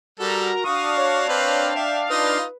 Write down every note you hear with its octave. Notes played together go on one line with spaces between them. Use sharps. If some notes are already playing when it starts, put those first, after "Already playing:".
G3 F#4 A4 A#4 A#5
D4 F#4 F5 C#6 D#6
C#5
C4 B4 G5
E5 G5
D#4 F4 B4 D#6